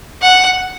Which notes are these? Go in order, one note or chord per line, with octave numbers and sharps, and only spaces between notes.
F#5